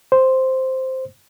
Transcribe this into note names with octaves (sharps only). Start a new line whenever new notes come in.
C5